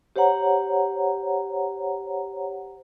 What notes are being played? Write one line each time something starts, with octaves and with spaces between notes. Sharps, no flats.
G4 C5 C#5 F#5 A#5